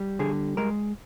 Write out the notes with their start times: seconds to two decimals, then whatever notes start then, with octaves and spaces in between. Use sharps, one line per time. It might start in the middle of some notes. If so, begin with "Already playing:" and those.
Already playing: G3
0.19 D3 G#4
0.57 G#3 A#4